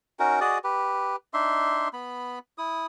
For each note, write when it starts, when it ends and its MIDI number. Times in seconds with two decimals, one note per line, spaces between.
0.19 0.40 61
0.19 0.40 63
0.19 0.40 66
0.19 0.40 70
0.41 0.58 66
0.41 0.58 68
0.41 0.58 74
0.41 0.58 75
0.64 1.16 67
0.64 1.16 71
1.34 1.88 62
1.34 1.88 63
1.34 1.88 76
1.34 1.88 84
1.93 2.39 59
1.93 2.39 83
2.58 2.86 64
2.58 2.86 87